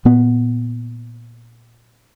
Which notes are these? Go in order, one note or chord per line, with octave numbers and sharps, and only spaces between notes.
A#2 B3